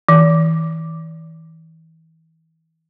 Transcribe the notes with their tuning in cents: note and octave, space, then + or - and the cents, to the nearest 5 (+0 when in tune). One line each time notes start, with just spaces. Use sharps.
E3 -35